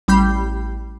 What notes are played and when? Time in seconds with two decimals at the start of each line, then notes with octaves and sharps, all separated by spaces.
0.08 A1 G3 B5 G6 C7